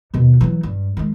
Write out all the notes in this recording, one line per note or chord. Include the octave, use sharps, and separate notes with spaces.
D#2 B2
E3 F#3
G2
D#3 G#3